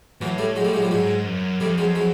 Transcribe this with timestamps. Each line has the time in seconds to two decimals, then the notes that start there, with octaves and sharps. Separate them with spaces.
0.21 A2 E3 F#3
0.38 G3 A3
0.56 F#3 G#3
0.65 G3 A3
0.73 F#3 G#3
0.82 F3 G3
0.91 G#2 F#3 G#3
1.26 F#2
1.60 F2 G3 A3
1.78 F#3 G#3
1.95 F#3 G#3